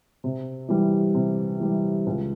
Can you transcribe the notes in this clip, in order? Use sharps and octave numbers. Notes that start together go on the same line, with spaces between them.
C3
E3 G3
C3
E3 G3
C#2